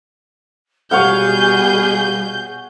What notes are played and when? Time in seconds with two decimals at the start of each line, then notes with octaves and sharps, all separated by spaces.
0.91 B2 G3 G#4 C#5 F5 F#5 G6